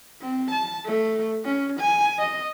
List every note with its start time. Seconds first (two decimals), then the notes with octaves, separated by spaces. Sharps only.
0.21 C4
0.51 A5
0.86 A3
1.45 C#4
1.81 G#5
2.19 D#5